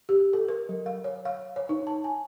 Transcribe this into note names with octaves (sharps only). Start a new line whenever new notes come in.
G4
A4
A#4
F#3
F5
C#5
F5
C#5
D#4
A5
G#5